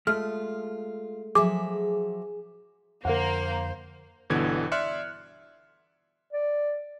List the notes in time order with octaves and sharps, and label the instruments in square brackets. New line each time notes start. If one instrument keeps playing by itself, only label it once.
[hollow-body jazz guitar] G#3 A3 [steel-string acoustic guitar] F4 [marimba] F6
[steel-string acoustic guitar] F3 F#3 E5 [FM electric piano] G#4 [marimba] D6
[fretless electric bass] F2 D3 [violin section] A#3 [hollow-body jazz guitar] A#4 F5 F#5 [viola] C5
[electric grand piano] G1 B2 D3 E3 G#6
D5 E5 C6 F6 F#6 C#7
[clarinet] D5